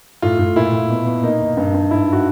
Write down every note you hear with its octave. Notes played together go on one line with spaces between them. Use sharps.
A2 F4
A2
A#2 E4
A#2
B2
B2
A#3 D#4
D#2
G2
G2
G#2 E4
F#4